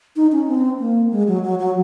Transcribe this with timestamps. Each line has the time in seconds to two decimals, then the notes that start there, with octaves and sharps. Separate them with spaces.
0.16 D#4
0.32 C#4
0.48 C4
0.80 A#3
1.12 G#3
1.28 F#3
1.43 F#3
1.59 F#3